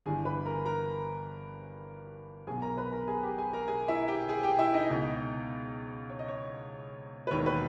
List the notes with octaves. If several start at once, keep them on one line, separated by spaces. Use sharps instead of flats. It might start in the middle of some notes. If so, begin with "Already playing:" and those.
G1 G2 E3 G#4 G#5
B4 B5
A#4 A#5
A#4 A#5
B1 B2 G#4 G#5
A#4 A#5
B4 B5
A#4 A#5
G#4 G#5
G4 G5
G#4 G#5
A#4 A#5
G#4 G#5
E4 E5
G4 G5
G#4 G#5
G4 G5
E4 E5
D#4 D#5
C#2 B2
C#5
D#5
C#5
B4
E1 D#2 D#3 C#5
B4